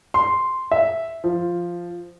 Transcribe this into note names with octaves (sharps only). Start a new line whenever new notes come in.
C6
E5
F3